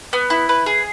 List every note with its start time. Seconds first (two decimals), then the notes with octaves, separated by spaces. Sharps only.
0.13 B3
0.30 E4
0.49 B4
0.66 G#4